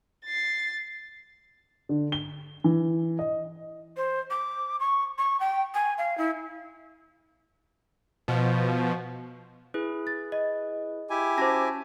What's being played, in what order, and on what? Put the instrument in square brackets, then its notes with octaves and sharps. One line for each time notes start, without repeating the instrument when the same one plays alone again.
[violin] A6 C7
[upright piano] D3
G7
E3
D#5
[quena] C5
D6
C#6
C#6
G5
G#5
F5
E4
[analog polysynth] B2 F3
[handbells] E4 G#4 B4
[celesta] A6
D#5
[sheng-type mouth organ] E4 G4 G#5
[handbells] C#4 F#4 A5 [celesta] C5 D6 A#6